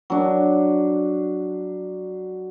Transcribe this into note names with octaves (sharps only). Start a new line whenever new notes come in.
F#3 D4